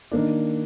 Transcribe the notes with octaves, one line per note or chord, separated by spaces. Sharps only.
D#3 A#3 D4